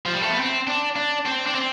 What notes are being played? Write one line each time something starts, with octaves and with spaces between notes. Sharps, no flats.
F3
G3
A3
B3
C4
D4
D4
C4
D4
C4